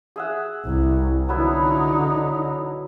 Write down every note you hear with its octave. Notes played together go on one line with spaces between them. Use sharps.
G#4 E5 F#5
C2
D3 F#3 B3 D#4 E4